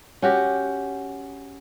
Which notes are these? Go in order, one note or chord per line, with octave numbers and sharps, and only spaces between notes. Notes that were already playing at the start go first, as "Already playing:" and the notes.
C#4 F#4 G4